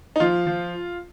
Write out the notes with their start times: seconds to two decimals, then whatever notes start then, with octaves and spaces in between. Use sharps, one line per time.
0.16 D#4
0.20 F3 F4
0.47 F3